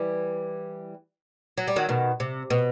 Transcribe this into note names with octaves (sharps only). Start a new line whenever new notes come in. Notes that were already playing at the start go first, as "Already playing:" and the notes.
Already playing: E3 G3
F#3
G3
D#3 F#3
B2 D#3
C3
B2